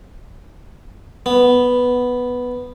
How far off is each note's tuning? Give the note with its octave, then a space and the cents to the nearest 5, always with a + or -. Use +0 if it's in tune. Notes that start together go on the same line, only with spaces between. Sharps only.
B3 +0